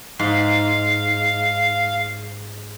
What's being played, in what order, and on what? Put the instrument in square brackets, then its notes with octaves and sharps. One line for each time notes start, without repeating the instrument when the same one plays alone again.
[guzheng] G#2 [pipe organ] F5